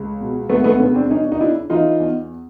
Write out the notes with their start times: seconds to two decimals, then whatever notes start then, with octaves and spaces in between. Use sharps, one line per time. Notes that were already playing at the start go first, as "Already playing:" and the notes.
Already playing: C#2
0.20 B2
0.49 C#2 A3 B3
0.64 A3 B3
0.79 B2 B3 C#4
0.94 C4 D4
1.10 E2 C#4 D#4
1.24 D4
1.32 D#4
1.40 C#3 D4 E4
1.70 E3 D#4 F4
2.00 E2